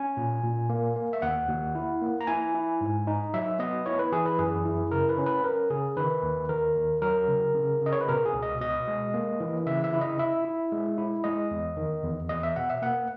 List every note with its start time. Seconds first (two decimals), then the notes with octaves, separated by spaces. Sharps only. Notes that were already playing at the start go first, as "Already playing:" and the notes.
Already playing: C#4 G#5
0.17 A#2
0.43 A#2
0.70 A#3
0.96 A#3
1.13 E5
1.22 D#2 F#5
1.49 D#2
1.75 E4
2.02 A#3
2.21 A#5
2.27 E4 G#5
2.55 E4
2.81 G#2
3.07 D#4
3.34 F#3 E5
3.59 B3 D#5
3.86 E4 C#5
3.99 B4
4.12 E3 G#4
4.26 B4
4.39 F#2 G#4
4.65 E4
4.91 C#3 A#4
5.09 B4
5.18 C#4
5.26 B4
5.44 C#4 A#4
5.70 C#3 G#4
5.97 D#3 B4
6.23 D#2
6.49 D#3 A#4
6.76 D#2
7.02 F#3 A#4
7.28 C#3
7.55 C#3
7.81 C#3 D#5
7.92 C#5
8.01 B4
8.09 B2 A#4
8.26 G#4
8.34 C#2
8.43 D#5
8.60 B2 D#5
8.88 G#3
9.14 A#3
9.40 E3
9.66 C#3 E5
9.84 E5
9.93 E4
10.01 D#5
10.18 E4 E5
10.45 E4
10.72 G#3
10.98 E4
11.24 G#3 D#5
11.51 E2
11.77 D#3
12.03 E2
12.29 E2 D#5
12.43 E5
12.56 B2 F#5
12.70 E5
12.82 A#3 F#5